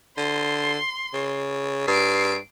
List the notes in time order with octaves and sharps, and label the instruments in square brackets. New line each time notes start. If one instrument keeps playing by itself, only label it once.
[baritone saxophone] D3 [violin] C6
[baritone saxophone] C#3
[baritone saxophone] G2 [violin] C7 D7